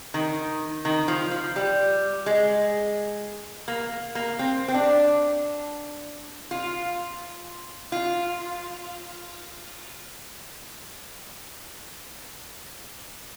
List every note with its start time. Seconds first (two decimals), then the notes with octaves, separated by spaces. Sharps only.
0.14 D#3
0.85 D#3
1.08 F3
1.31 F3
1.56 G3
2.26 G#3
3.68 A#3
4.15 A#3
4.39 C4
4.68 C4
4.74 D4
6.51 F4
7.92 F4